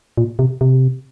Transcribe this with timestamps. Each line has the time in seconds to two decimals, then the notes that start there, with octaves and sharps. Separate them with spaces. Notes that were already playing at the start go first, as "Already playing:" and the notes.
0.17 A#2
0.39 C3
0.61 C3